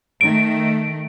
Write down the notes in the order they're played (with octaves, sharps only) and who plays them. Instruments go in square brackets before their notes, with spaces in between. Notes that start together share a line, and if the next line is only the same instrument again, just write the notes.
[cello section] D#3 A3 [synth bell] D7